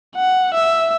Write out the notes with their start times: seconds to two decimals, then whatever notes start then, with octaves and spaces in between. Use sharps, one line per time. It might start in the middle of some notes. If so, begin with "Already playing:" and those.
0.16 F#5
0.54 E5